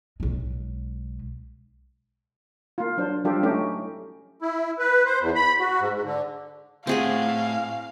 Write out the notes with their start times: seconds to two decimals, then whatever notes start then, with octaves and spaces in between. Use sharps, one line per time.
0.20 B1 G#3
2.78 A#3 F4
2.97 F#3 D4 C5
3.24 F3 G3 D4 F4 G4 A4
3.43 F#3 A3 C#4 D#4 G4
4.42 E4
4.79 B4
5.06 C5
5.21 E2
5.35 B5
5.60 F#4
5.80 G#2
5.93 G#2
6.05 D3
6.87 A2 C4 E4 G#4 F5 F#5